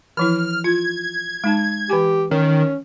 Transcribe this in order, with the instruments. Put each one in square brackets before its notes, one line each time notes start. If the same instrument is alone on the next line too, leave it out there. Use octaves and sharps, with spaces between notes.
[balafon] E3 F3 E4 [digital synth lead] F6
[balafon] F4 [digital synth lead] G#6
[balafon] G#3 D#4 A5
[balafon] E3 G#5 [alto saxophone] G4
[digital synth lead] D#3 [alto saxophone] C#4